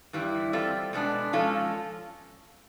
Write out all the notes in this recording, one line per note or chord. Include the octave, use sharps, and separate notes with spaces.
G2 E3 G3 E4
G3 C4 F4 A4
B2 G#3 B3 D4
F3 G#3 C#4 F4 A4